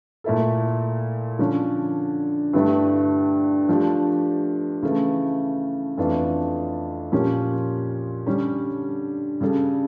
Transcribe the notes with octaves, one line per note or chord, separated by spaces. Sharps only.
A#2 A3 E4 A4
D3 F3 C#4
G2 D3 A3 E4 G4
F3 A3 D4 G4
C#3 E3 A3 E4
F2 E3 A3 D4 F4
A#2 F3 C#4 G4 A#4
D3 G3 C#4
C#3 G3 D4 A4